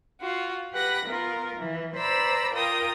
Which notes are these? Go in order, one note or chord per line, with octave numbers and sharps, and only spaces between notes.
F4 F#4
G4 B4 F#5 B5 A#6
B3 F4 A#4
E3
B4 C5 D5 A#5 B5 E6
F4 A#4 G5 A#5 D#6